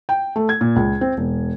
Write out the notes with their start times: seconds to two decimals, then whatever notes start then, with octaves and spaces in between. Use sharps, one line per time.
0.09 G5
0.36 A3
0.49 G#6
0.61 A#2
0.76 C#2
1.01 C4
1.17 E1